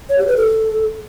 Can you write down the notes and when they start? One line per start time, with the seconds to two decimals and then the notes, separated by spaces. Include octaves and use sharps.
0.09 C#5
0.18 G4
0.27 B4
0.37 A4